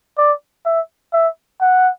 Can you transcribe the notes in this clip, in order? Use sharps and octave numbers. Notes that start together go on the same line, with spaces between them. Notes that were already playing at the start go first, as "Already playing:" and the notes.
D5
E5
E5
F#5